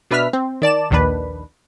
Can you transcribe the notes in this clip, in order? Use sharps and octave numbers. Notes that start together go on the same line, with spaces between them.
B2 D4 B4 E5 F6 B6
C4
D#3 D5 A5 E7
A#1 D#2 D#3 D4 B4